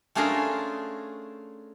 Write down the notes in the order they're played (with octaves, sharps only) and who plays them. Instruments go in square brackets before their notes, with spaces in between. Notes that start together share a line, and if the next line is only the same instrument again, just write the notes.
[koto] A3 C#4 D4 F4 G#4 A#4